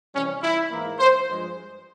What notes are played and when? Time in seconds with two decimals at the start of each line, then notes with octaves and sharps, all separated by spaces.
0.14 C3 E3 G3 C#4
0.42 E4
0.71 G#2 E3 A#3
0.99 C5
1.27 G2 F3 G#3